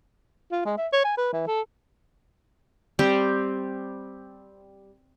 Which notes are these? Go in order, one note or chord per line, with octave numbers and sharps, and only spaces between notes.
F4
G#3
E5
C#5
G#5
B4
E3
A4
G3 C4 G4